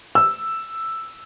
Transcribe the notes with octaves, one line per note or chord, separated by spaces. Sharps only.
E6